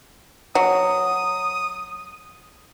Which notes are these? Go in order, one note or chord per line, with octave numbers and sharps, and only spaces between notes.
F#3 D#6